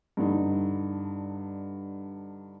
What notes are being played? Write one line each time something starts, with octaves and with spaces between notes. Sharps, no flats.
G2 D3 D#4